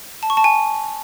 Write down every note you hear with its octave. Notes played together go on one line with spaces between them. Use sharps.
A5
C#6
A5
G#5